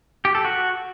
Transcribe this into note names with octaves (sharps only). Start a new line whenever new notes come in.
G4
A4
F#4